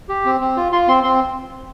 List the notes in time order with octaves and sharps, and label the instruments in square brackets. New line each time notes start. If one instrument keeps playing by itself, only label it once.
[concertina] G4
C4
C4
F4
F4 C6
C4 C6
C4 C6